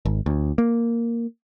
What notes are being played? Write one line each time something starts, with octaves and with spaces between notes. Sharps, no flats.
G#1
D2
A#3